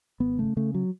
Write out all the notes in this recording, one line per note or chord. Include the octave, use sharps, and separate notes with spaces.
G#1 B3
C#3 A3
C#3 A3
F#3